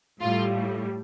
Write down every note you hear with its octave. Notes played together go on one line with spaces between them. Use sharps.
A2 G3 F4